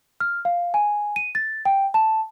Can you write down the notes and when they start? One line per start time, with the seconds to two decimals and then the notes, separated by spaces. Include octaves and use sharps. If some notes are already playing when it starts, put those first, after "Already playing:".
0.20 F6
0.45 F5
0.74 G#5
1.16 D#7
1.35 A6
1.65 G5
1.94 A5